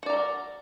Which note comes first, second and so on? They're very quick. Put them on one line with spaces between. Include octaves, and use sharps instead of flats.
F#4 D5 A#5 A4 A#4